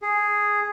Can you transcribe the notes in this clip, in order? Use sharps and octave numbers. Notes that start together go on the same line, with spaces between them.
G#4